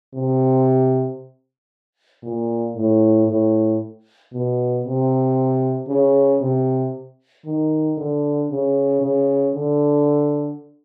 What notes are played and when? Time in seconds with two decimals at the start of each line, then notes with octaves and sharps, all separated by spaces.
0.14 C3
2.23 A#2
2.76 A2
3.27 A2
4.33 B2
4.84 C3
5.88 C#3
6.41 C3
7.46 D#3
7.98 D3
8.51 C#3
9.02 C#3
9.55 D3